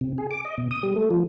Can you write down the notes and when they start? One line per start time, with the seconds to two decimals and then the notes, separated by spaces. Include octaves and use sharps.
0.01 C3
0.18 G#4
0.31 D6
0.45 D#5
0.58 B2
0.71 D#6
0.83 G3
0.96 A3
1.11 F3